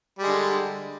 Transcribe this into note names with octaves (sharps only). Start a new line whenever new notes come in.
D3 G3 G#3